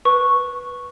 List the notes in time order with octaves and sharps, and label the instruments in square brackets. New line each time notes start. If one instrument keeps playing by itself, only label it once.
[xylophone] B4 C#6